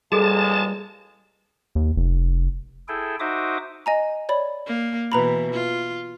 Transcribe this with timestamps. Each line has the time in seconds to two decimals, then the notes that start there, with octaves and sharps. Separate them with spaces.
0.12 A1 A#2 G3 G#3 F#4 G#4 A4 A5
1.75 D#2
1.96 F1
2.88 E4 G#4 A4 G5
3.20 D#4 F#4 C5 E5 D6 D#6
3.86 D#5 G#5 A#5
4.29 C#5 D5 B5
4.66 A#3
5.12 B2 E3 B4 A#5 B5
5.52 F4